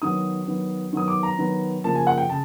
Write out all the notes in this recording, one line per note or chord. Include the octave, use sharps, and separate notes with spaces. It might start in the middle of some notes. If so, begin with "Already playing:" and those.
D#3 F#3 B3 D#6
D#3 F#3 B3
D#3 F#3 B3 D#6
D6
A#5
D#3 F#3 B3
C#3 F3 A#3 A5
G#5
F#5
G5
C#3 A5